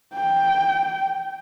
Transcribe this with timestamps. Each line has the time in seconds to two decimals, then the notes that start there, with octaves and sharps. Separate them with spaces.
0.15 G5